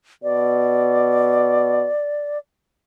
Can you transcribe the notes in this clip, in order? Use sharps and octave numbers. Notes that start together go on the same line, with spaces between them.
B2 D5